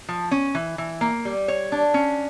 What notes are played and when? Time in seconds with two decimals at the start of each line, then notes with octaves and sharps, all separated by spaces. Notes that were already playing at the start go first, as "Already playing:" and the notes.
0.09 F3
0.31 C#4
0.55 E3
0.78 E3
1.01 A#3
1.25 G3
1.48 C#5
1.72 D4
1.94 C#4